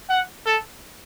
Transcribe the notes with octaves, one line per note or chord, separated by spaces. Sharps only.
F#5
A4